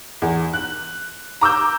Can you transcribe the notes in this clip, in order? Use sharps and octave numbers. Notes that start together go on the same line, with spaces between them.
E2
F#6
A#5 D6 E6 G6